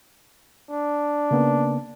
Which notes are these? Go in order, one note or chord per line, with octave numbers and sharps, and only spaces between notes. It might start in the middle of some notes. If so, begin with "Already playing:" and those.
D4
C#3 A#3 B3